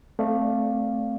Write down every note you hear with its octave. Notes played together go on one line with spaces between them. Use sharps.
A3 C4 D5 F5